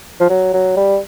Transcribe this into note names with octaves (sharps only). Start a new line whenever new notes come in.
F3
F#3
F#3
G3